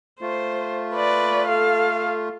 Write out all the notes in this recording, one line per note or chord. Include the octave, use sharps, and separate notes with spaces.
A3 F4 C5
B4 D5
A4 F5